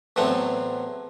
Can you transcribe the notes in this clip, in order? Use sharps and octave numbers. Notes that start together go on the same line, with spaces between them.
E2 A2 F#3 A3 C4